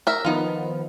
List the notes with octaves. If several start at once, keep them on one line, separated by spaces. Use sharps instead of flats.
A#4 E5
D#3 F3 B3 D#4 F4